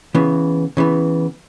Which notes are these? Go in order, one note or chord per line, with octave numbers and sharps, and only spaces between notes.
C#3 E3 B3
C#3 E3 B3